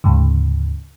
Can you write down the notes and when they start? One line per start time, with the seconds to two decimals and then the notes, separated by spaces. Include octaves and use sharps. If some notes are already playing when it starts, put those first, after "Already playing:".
0.04 D2 G#2 C#3